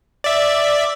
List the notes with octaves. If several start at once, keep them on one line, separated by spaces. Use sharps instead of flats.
D5 E5